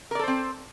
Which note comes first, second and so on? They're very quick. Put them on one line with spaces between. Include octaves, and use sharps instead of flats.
A#4 D5 A4 C5 C4